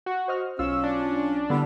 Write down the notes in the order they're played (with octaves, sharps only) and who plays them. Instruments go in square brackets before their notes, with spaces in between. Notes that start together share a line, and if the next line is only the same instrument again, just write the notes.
[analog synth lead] F#4
[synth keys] C5 D#5 F6
[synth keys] B1 F4 F5 [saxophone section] C#4 [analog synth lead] E6
[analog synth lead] D4
[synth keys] D3 B3 E4 [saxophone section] G3